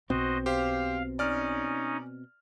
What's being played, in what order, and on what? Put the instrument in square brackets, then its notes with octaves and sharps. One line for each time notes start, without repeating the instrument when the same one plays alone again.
[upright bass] B1 [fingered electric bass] B2 C4 [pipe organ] F#4 C5 D#5
[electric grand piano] G4 C5 [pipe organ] F5
[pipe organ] C#4 D#4 [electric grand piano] D5 F6